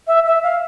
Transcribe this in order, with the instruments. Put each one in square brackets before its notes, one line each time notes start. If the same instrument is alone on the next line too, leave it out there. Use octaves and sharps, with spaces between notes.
[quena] E5
E5
F5